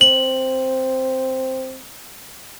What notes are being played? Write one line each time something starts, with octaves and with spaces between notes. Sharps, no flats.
C4 F#7